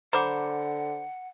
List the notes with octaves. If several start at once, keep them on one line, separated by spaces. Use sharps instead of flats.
D3 C5 F#5 A#5 B5 D6